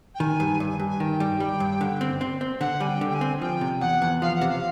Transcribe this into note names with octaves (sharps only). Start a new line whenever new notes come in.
G5
D#3 G#5
G2
G2
G2
G#5
D#3 G5
G3
G3
G2
D3
C4
C4
C4
D3 F#5
G3 G#5
G5
D3
G5
G#5
C4
F3 G5
C3
E2 F#5
E2
F3 F5
F#5
C3
F5